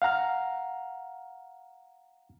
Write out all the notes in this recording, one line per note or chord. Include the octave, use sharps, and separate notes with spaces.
F5 F#5 A#5 F6